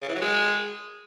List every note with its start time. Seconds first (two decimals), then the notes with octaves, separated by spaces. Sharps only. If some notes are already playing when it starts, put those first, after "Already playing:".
0.02 C#3
0.09 E3
0.15 F#3
0.21 G#3